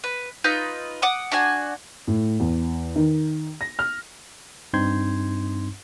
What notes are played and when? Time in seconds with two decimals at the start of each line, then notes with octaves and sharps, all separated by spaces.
0.04 B4
0.44 D#4 F4 B4 G6
1.02 F#5 D6 D#6
1.32 D4 F#4 F#5 G#5
2.07 A2
2.40 E2
2.96 D#3
3.61 A#6
3.79 F6
4.74 G2 C4 D#4 C6 G6 G#6